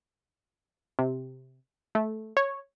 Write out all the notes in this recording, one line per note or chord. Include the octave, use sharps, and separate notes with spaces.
C3
A3
C#5